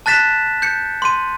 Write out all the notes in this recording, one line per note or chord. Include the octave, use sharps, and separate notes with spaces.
A5 F#6 A6 B6 E7
G6 C#7
C6 D#7